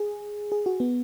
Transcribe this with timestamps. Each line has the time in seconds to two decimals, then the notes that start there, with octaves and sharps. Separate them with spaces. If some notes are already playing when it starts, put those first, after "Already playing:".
Already playing: G#4
0.52 G#4
0.66 F#4
0.80 B3